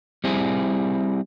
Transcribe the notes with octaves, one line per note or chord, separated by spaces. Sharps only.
G3 C4 E4 G#4